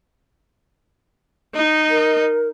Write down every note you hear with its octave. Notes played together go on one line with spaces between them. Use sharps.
D#4 D#5
A#4